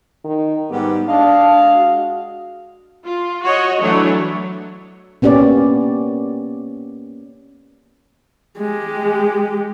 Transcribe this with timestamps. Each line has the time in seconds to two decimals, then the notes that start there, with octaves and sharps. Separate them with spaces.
0.24 D#3
0.70 G#2 G3 B3 G4
1.08 G#3 D4 D#5 F5
1.76 F#4
3.04 F4
3.43 F#4 C#5 D#5
3.81 E3 F#3 A3 D4 C#5
5.22 A#3 B3 C#4 G4 D5
8.58 G#3 G4